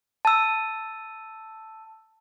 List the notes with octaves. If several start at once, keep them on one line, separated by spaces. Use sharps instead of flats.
A5 E6